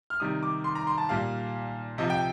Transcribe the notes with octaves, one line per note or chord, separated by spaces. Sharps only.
F6
C3 D#3 G3 D#6
D6
C6
A#5
C6
A5
A#2 G3 F5
C3 F3 D#5
G5